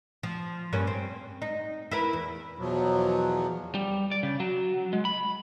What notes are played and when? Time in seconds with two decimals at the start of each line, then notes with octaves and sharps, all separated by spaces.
0.23 F3
0.73 G2 A#3 C#4
0.87 C4
1.42 D#4
1.91 E4 A#4 B4
2.13 E2
2.58 E2 B2 F3 F#3
3.75 G3
4.12 D5
4.23 C#3
4.40 F#3
4.93 G#3
5.05 B5